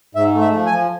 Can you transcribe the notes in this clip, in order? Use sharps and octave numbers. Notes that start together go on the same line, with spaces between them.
G#2 E5
A3
E5
F3
G#5
F3